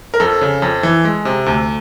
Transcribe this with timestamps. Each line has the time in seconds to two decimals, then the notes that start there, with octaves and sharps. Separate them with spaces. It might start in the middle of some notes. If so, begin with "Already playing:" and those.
0.14 A#4
0.20 F2 A4
0.41 C#3
0.62 F2
0.83 E3
1.04 G#3
1.25 C3
1.46 D2